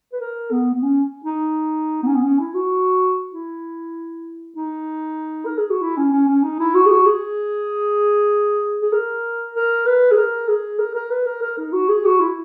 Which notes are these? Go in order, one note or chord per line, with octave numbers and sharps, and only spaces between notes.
B4
A#4
B3
B3
C#4
D#4
B3
C#4
B3
C#4
E4
F#4
E4
D#4
A#4
G#4
F#4
E4
C#4
C#4
C#4
D#4
E4
F#4
G#4
F#4
G#4
G#4
A#4
A#4
B4
G#4
A#4
G#4
A#4
A#4
B4
A#4
A#4
D#4
F#4
G#4
F#4
E4